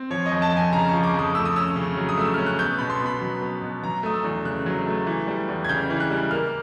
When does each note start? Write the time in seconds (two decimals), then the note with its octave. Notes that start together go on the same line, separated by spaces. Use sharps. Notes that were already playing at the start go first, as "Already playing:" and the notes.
Already playing: C4
0.10 F3 C#5
0.26 D#5
0.31 F2
0.42 A5
0.52 F2 G#5
0.72 C#3 A#5
0.88 F3 C#6
1.04 D6
1.14 F2 D#6
1.35 A3 E6
1.45 D#6
1.56 C#4 E6
1.76 C#3
1.97 F#3
2.09 D#6
2.18 A3 E6
2.34 C#4 F6
2.46 F#6
2.59 B3 G6
2.78 B2 B5
2.90 C6
3.00 B2
3.06 B5
3.21 F#3
3.42 B3
3.62 B2
3.83 F#3 A#5
4.03 A3 D#6
4.14 E6
4.24 E2
4.45 C#3 F#6
4.66 F#3
4.87 A3
5.06 E3
5.27 G3
5.49 E2
5.64 G#6
5.69 C#3 G6
5.90 E3
6.00 F#6
6.11 G3
6.31 A#3 F6